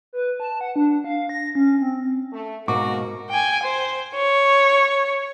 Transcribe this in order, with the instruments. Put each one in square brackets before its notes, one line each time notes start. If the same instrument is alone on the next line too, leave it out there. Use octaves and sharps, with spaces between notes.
[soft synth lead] B4
A5
F#5
D4
F5
A#6
C#4
C4
[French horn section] A3
[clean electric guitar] G#2 B2 [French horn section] A#3 A#4 [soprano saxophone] F#4 [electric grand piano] C#6 D6
[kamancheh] G5 G#5
C5
C#5